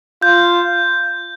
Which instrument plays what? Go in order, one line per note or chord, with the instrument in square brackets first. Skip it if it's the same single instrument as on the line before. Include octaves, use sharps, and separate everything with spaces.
[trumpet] F4 [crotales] G6